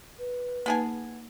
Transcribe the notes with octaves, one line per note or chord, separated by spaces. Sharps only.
B4
A#3 B3 D#4 G#4 G#5 A5